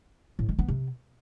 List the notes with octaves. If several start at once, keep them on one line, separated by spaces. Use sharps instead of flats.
A2
G#3
B3
C3